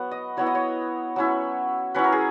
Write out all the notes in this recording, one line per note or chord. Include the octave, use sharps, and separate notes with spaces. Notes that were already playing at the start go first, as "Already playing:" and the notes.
Already playing: F#3 B3 F#5
D#5
F#3 B3 E4 C#5
D#5
C#5
F#3 C#4 E4
F#3 C#4 E4 B4
A#4
G#4